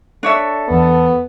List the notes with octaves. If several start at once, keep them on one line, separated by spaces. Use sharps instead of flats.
D4 A4 C#5 E5
E2 B3 A5